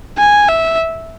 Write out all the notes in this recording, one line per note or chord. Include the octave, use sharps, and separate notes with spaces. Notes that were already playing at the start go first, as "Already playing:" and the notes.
G#5
E5